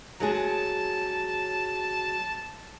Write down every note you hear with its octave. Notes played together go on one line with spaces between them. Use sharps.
F#3 G#3 G#4 A5